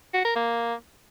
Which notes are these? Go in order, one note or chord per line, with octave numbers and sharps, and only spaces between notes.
F#4
A#4
A#3